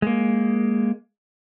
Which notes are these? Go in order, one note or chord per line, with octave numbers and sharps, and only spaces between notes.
G#3 A#3